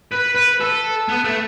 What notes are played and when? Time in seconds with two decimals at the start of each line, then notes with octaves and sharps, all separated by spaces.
0.12 B4
0.35 B4
0.60 A4
1.09 B3
1.24 A3